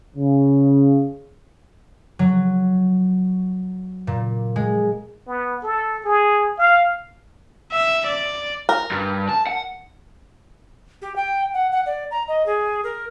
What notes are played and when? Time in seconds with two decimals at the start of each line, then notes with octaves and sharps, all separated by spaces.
0.16 C#3
2.19 F#3
4.07 A#2
4.56 G#3
5.27 B3
5.63 A4
6.05 G#4
6.59 F5
7.72 E5
8.07 D5
8.69 A#4
8.92 G2
9.29 A5
9.47 F#5
11.02 G4
11.16 G5
11.54 F#5
11.72 F#5
11.86 D5
12.11 A#5
12.28 D#5
12.46 G#4
12.84 A#4